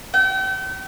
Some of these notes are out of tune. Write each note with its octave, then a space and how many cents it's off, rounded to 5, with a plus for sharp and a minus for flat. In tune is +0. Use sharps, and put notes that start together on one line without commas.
G5 -40